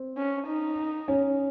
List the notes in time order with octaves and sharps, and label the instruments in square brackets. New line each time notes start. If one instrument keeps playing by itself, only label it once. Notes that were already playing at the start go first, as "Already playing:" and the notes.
Already playing: [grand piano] C4
[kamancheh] C#4
D#4
[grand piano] C#4